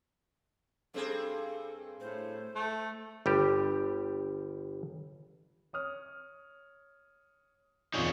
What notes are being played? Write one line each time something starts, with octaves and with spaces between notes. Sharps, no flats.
G2 C4 G#4 A4
A2 C5
A3
G1 G3 G4
C#5 D#6 F6
E1 D#4 F4 G#4 C#5 D5